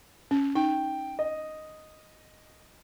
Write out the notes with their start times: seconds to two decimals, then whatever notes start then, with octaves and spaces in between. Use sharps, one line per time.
0.31 C#4
0.55 D#4 G5
1.19 D#5